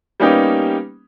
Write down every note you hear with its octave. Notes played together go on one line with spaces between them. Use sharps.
G3 A#3 B3 C#4 D#4 G4